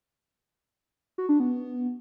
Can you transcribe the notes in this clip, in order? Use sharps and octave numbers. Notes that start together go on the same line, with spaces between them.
F#4
D4
B3